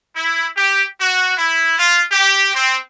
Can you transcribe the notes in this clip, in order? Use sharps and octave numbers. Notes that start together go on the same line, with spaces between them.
E4
G4
F#4
E4
F4
G4
C4